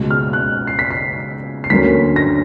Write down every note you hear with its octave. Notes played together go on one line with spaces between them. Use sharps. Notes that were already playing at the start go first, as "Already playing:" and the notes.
Already playing: C#2 B2 G#3
F6
F#6
C7
B6
C7
C7
D2 D3 F#3 A#3 C#4 B6
A#6